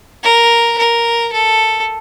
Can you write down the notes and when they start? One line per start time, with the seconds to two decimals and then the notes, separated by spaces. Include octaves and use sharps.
0.23 A#4
0.78 A#4
1.32 A4